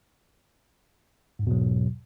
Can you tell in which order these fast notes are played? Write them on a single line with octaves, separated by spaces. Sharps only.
G#2 E2 B2 F#3